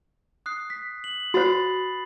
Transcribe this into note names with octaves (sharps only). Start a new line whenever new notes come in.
D#6 F#6 C7
B6
F#7
F#4 C5 B5 A6 C7